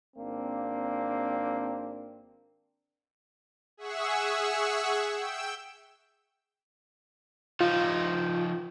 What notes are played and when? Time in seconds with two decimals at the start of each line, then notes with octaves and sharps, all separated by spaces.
0.16 G#1 A#3 C4 D4
3.77 G#4 E5 F#5 C#6 E6
5.15 G5 E6
7.61 F3 D#4 F4